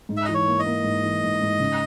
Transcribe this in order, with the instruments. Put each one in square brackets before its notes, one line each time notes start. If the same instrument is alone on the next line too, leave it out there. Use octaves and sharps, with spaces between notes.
[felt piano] G#2
[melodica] E5
[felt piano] E3 [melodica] D#5
[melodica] C#5
[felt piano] A#3
[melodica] D#5
[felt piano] A#3
G#2
E3
G#2
G#2
C#3